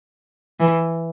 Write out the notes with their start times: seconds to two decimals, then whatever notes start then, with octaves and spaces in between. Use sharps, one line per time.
0.60 E3